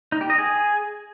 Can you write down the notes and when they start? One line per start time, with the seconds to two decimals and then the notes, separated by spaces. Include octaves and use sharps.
0.12 D#4
0.21 G4
0.30 D#5
0.39 G#4